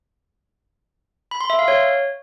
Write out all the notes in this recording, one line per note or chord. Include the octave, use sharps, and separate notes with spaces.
B5
C6
E5
F5
C#5